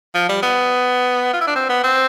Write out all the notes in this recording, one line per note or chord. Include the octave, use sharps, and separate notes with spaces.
F3
G3
B3
F4
E4
D4
C4
B3
C4